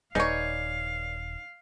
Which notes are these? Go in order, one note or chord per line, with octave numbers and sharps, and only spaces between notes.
D#1 D#4 B4 C#5 D5 F5 G#5